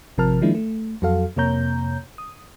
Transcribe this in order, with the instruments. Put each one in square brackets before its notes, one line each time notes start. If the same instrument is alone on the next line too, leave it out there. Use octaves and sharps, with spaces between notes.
[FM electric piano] A1 C3 F3 A#4 A5 F6
D#3 F3 G#3 A#3 D4 E4
A3
F2 F#3 F#4 A4 F5
F2 C3 A#3 C#5 A#5 G6
D#6